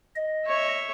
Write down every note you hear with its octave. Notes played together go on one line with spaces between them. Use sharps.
D#5
C#5 E5